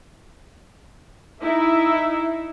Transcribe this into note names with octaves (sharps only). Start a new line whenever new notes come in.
D#4 E4 E5